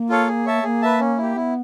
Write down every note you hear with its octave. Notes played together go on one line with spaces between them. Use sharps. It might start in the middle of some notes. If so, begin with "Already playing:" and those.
Already playing: A#3
F4 A4 C#5 F5
G#4
C#5 E5 A5
A#3 G#4
B4 E5 A5
C#4
E4 G4
B3 E4